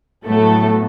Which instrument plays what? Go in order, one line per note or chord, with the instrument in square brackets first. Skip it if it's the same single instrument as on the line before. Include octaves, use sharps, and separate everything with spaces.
[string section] A2 F#3 A3 B3 A4